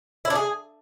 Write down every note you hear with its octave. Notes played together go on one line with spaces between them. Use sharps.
E4
D4
G#4